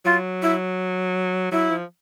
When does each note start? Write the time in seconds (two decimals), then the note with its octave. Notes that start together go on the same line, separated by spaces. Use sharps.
0.05 F#3 F4
0.42 E4
1.51 F#3 E4
1.70 F3